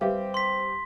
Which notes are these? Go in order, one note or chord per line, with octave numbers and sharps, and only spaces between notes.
G3 C4 G4 B4 E5 F5
C6 B6